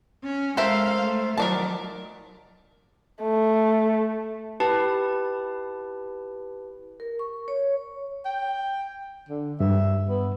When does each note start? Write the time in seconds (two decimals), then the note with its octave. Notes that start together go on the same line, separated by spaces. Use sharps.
0.24 C#4
0.57 G#3 A4 A#4 C5 E5 F5
0.97 A3
1.37 D#3 F#3 A#4 D5 A5
3.22 A3
4.60 E4 G4 B4 A5
7.00 A#4
7.19 C#6
7.48 C#5
8.25 G5
9.29 D3
9.60 G2 E5
10.09 B3